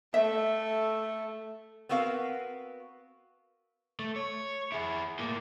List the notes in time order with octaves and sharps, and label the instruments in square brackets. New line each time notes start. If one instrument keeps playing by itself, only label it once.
[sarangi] A3 [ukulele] E5
[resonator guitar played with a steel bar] B3 C4 F#4 A#4 F5
[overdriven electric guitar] A3
C#5
E4 G#4
A2 A#3